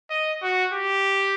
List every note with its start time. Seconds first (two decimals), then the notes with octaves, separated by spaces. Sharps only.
0.10 D#5
0.42 F#4
0.73 G4